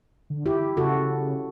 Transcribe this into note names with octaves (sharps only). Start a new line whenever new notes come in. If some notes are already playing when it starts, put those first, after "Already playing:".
D3
E4 G4
C#3 F#4 A4